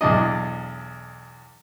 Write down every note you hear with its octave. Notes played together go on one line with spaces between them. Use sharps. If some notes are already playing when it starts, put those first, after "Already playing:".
B1 E2 D4 D#5